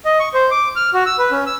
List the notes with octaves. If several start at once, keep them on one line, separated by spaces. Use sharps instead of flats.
D#5
C#6
C5
D6
F6
F#4
E6
B4
C#4
E6